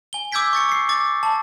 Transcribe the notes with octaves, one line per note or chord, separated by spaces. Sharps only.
G#5 G7
D6 E6 G6 G#6 B6 D7
C#6 A6 C#7
C#6 C7
D6 A6
A5